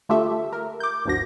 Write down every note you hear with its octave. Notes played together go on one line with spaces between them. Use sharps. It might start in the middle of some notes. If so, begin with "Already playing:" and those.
D3 A3 F4 G4 A4 E5
A#4
D6 G6
G1 D2 G2 F3 F#4 A#6